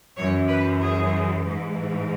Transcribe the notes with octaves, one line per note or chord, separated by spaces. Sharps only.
F#2 E3 C#5
B4
G#4
G#2 E3